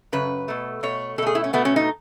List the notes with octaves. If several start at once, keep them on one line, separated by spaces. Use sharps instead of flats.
F#2 C#3 B4
B2 A3
B2 A3 C#5
B2 A3 G#4 A4
E4
C#4
B2 A3 B3
C#4
D#4